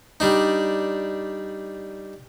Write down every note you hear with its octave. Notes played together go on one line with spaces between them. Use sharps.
G3 D4 D#4